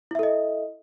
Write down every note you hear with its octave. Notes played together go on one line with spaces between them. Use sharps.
E4 A4 D#5 E5